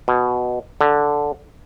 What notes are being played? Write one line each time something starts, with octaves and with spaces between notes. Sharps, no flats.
B2
D3